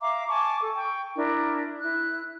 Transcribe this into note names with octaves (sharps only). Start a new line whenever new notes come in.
E5 F5 A#5 D6
G#5 A5 C#6 D6
A4
G5 C#6
D4 E4 A#4
E4 F#6